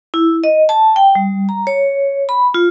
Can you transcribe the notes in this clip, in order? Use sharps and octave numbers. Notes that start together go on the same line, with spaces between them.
E4
D#5
A5
G5
G3
A#5
C#5
B5
F4